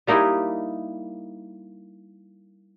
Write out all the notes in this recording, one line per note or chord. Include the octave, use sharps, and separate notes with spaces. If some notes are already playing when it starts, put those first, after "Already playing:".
G3 A#3 D#4 E4 G4 G#5